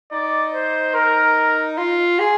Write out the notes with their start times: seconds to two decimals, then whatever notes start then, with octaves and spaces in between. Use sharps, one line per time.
0.12 D#4 D5
0.54 C5
0.95 A#4
1.78 F4
2.19 G#4